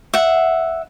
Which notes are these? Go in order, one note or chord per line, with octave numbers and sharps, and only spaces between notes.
E5 F#5